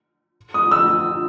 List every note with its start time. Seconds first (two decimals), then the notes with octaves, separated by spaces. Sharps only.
0.54 D#6
0.71 E6